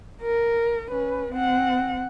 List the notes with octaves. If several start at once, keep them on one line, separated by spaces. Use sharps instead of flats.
A#4
C#4 B4
C4 F#5